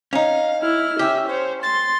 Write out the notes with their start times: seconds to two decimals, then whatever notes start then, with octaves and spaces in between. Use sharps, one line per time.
0.13 C#4 D#4 F5
0.62 E4 F6
0.99 C#4 G4 E5
1.29 C5 C#5
1.63 C6 A6